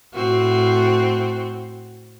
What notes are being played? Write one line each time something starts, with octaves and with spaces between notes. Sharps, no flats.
A2 C4 F#4